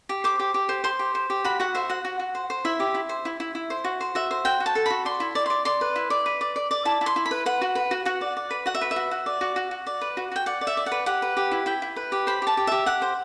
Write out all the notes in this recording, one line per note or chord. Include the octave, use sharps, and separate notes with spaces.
G4
C5 D6
G4
G4
C5
C5 C6
G4
C5
G4
F#4 B5
F#4 F#5
C5 E5
F#4 F#5
F#4
F#4
C5
C5
E4 E5
G4
E4
C5
E4
E4
E4
C5
F#4
C5
F#4 E5
C5
F#4 G5
F#4
A5
A4
F#4 B5
D5 C6
E4
D5
D5 C6
D5 C6
B4
E4
D5
B4
D5
D5
D5
E4 A5
E4
C6
E4
B5
B4
B4 F#5
F#4
B4
F#4
F#4 F#5
D5
D5
B4
F#4 F#5
E5
B4
E5
F#4
F#4
D5
F#4
F#4
F#4
D5
B4
F#4
F#4 G5
D5 F#5
D5
E5
D5
F#5
B4
G4 F#5
B4
G4
E4
E4 G5
E4
B4
G4
C5 B5
G4 A5
G4
G4 E5
G4 F#5
C5